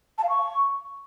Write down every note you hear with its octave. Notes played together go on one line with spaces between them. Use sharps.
A5
F5
C#6